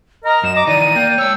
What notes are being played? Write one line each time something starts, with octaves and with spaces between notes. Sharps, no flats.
A#4 D#5 A#5
F#2 E7
D#5 A#5 D6
D#3 E3 D5 A#5 D#7
A#3 G5
G#3 C#5 E6